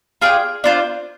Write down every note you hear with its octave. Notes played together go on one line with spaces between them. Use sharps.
F4 G#4 D5 G5
D4 F4 C5